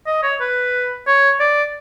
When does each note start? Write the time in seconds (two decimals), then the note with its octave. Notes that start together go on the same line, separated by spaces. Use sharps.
0.06 D#5
0.23 C#5
0.40 B4
1.07 C#5
1.40 D5